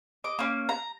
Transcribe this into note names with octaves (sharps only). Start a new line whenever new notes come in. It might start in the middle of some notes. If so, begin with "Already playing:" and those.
D#5 D6
A#3 C#4
A#5